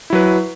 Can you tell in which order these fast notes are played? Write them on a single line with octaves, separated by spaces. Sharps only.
E4 F#3 B4